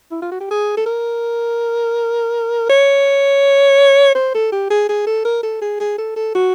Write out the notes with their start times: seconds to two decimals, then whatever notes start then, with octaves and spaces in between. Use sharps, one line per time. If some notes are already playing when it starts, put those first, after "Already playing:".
0.11 E4
0.22 F4
0.31 F#4
0.40 G4
0.51 G#4
0.77 A4
0.86 A#4
2.69 C#5
4.15 C5
4.34 A4
4.52 G4
4.70 G#4
4.89 G#4
5.07 A4
5.25 A#4
5.43 A4
5.62 G#4
5.80 G#4
5.98 A4
6.16 A4
6.35 F#4